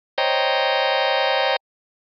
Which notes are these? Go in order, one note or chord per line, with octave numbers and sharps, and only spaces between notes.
C5 C#5 D#5 G5 A#5